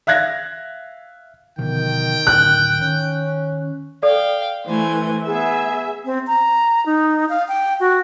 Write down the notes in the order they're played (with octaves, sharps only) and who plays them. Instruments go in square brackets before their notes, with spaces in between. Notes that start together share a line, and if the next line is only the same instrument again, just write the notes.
[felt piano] E5 F5 F#6 G#6 A#6
[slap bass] B2 D3 F3 [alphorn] D#3 [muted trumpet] G5
[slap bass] D1 [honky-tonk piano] F#6
[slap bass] D#3 [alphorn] C#4
[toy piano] A4 D5 [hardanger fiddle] F5 G5
[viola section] E3 A3 [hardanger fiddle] C5 G#5
[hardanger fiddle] B3 [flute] G#4 [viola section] E5
[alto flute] C4
A#5
D#4
F5
G5
F#4